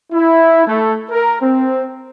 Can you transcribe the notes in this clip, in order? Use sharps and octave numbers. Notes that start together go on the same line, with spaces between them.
E4
A3
A#4
C4